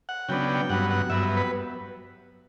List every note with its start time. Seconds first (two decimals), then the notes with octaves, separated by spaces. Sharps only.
0.09 F#5
0.29 C#3 F#3 B3 D4 G5
0.49 G5
0.69 G2 F#3 B3 F#5
0.90 F#5
1.10 G2 F#3 B3 E5
1.37 B4